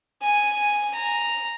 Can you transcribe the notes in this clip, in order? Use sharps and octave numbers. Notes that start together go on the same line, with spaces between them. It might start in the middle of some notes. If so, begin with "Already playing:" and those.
G#5
A#5